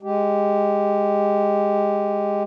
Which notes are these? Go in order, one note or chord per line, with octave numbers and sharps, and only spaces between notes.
G#3 G4